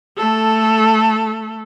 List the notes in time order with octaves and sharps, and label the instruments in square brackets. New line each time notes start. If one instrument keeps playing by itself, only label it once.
[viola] A3 A4